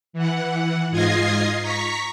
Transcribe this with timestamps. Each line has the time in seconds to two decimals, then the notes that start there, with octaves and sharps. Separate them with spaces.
0.13 E3 F#5
0.91 G#2 F4 D#5 G#6 A#6 C7
1.62 A#5 C#6 B6